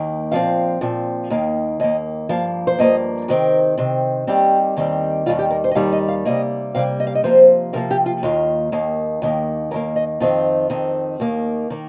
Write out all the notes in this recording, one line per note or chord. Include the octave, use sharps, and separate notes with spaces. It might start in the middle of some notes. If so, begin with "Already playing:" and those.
Already playing: D#2 D#3 A#3
A#2 F3 C4 F5
A#2 F3 C4
D#2 D#3 A#3
D#2 D#3 A#3 D#5
G2 F3 A#3 F5
C5
G2 F3 A#3 D#5
C3 D#3 C4 A#4
C3 D#3 C4
D#2 D#3 G3 C4 G4
D#2 D#3 G3 C4
D#2 D#3 G3 F4
G4
A#4
C5
D#5
D#2 D#3 G3 F5
D#5
F5
C3 G3 A#3 D#5
C3 G3 A#3 F5
D#5
F5
D#5
C3 F3 A#3 C5
C3 F3 A#3 A#4
G4
F4
D#2 D#3 A#3 F4
D#2 D#3 A#3
D#2 D#3 A#3
D#2 D#3 A#3 A#4
D#5
F2 D#3 C4 F4
F2 D#3 C4
D#2 D#3 A#3
D#3 A#3